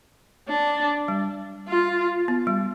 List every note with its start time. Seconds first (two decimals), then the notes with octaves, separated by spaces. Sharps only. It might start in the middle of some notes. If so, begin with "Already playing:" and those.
0.48 D4
1.08 G3
1.68 F4
2.28 B3
2.47 G3